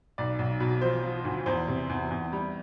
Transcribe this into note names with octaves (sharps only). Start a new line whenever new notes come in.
B1 D5
B1
B2
F3 C5
F3
D2
E2 C5
C3
E2
E2
G3